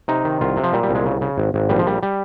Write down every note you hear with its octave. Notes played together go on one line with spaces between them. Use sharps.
C3 D#4
D#3
C2 F4
C3
F3
A#2 G3
G3
C2
G#3
C#3
C#3
G#1
G#1
A#1 G3
F3
A#1 G3
G3